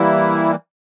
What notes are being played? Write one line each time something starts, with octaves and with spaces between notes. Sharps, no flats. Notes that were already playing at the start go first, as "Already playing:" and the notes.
Already playing: E3 G3 A#3 E4